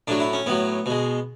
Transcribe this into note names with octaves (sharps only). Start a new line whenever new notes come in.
A2 F#3 D4
E4
C#4
A2 F#3 B3
B2 G#3